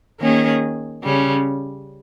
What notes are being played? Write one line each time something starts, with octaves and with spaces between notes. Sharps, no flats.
D#3 A#3 C#4 G#4
C#3 G3 C#4